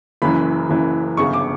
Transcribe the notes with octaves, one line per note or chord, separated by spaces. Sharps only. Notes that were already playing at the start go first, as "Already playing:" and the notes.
F#1 F#2 E3 B5
F#1 F#2 E3
G1 F#2 C#3 C#6
D6